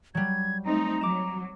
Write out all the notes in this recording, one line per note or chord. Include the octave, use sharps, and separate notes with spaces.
F#3 G3 G#6
A3 C4 D#4 A#5
F#3 D6 E7